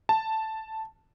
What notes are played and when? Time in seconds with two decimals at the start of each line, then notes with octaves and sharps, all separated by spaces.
0.09 A5